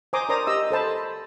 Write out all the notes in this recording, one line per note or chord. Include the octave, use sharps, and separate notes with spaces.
C5 G#5 A#5 C6 D6 D#6
A#4 C5 D5 A#5 D#6
G4 D#5 E6
A4 C5 A5 B5